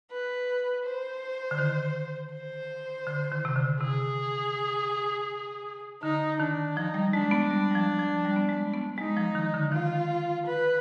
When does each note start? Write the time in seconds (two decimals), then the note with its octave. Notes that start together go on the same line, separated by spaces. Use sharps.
0.11 B4
0.85 C5
1.51 D3
1.58 D#3
2.33 C5
3.07 D3
3.32 D#3
3.45 C3
3.56 D3
3.81 C3 G#4
6.02 D3 D#4
6.39 D#3 D4
6.76 F3 D#4
6.94 G3
7.13 G#3 D4
7.31 B3
7.50 G3
7.71 G3
7.75 F3
7.99 F3
8.25 G3
8.36 B3
8.49 G#3
8.74 B3
8.98 G#3 D#4
9.17 F3
9.35 D#3
9.54 D3
9.72 D#3 F4
10.46 B4